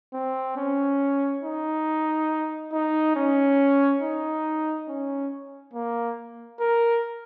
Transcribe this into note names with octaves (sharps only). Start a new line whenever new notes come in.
C4
C#4
D#4
D#4
C#4
D#4
C#4
A#3
A#4